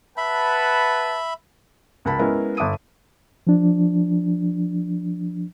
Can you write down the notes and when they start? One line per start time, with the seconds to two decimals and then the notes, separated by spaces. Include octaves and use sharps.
0.17 B4 E5 F#5 A5 B5
2.05 C#2 A#4 F5 A5 B5
2.19 G#3 B3 C#4 E4 A#4
2.57 G1 E5 A5 D6 D#6 D#7
3.47 F3 D4